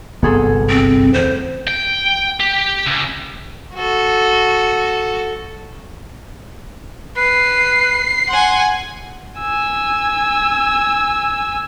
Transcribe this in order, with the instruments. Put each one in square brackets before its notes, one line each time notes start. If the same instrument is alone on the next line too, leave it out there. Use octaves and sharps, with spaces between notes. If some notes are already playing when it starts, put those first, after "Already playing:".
[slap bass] G1 C2 F#2 [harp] B3 G#4 A4
[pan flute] C4
[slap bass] E2 A2 C#3 [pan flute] C5
[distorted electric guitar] G5
G4
C#2
[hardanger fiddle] F#4 A4
[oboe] B4 [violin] C7
[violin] F#5 G#5 [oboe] C6
[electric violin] G#5 E6